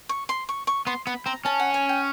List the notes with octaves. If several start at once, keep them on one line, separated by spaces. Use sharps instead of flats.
C#6
C6
C#6
C#6
B3 C6
B3 B5
C4 A#5
C#4 A5
F#5
G#5
G5